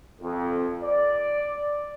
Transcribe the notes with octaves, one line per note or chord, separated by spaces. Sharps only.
F2
D5